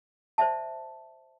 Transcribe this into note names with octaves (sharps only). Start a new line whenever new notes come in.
C5 D5 E5 A5